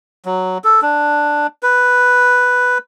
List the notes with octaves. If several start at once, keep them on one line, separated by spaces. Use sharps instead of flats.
F#3
A4
D4
B4